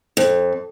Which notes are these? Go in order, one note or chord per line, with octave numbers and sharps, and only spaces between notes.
F2